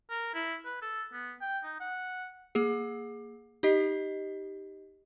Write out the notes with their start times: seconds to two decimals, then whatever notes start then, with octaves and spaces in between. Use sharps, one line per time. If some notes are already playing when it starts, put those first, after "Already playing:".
0.10 A#4
0.34 E4
0.65 B4
0.82 A4
1.12 B3
1.41 G5
1.63 D#4
1.80 F#5
2.55 A#3 G#4
3.63 D#4 G4 D#5 C7